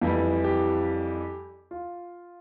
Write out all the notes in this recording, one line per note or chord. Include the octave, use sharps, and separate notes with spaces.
F2 E3 G3 E4
G4
F4